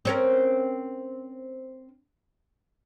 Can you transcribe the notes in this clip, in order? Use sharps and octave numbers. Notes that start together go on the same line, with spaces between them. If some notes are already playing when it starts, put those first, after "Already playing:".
C4 C#4 A#4